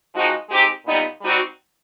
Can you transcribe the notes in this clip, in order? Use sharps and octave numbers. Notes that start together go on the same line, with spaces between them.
F3 G#3 C4 D#4 F#4
G#3 C4 D#4 G4
A#2 G3 B3 D#4
G3 C4 D#4 F#4